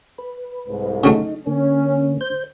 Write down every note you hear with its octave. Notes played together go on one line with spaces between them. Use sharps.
B4
C2 G#2
C#3 F#3 A3 D#4
D3 A#3 C#4
C5 G6